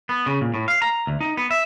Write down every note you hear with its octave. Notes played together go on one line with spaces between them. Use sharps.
B3
C#3
A#2
A2
F5
A#5
D2
D#4
B3
E5